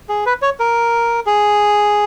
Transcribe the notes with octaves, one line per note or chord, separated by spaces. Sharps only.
G#4
B4
C#5
A#4
G#4